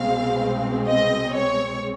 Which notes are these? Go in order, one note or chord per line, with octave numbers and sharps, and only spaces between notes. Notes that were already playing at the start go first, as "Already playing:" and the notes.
Already playing: C2 B2 G#3 C4 F5
D#5
C#5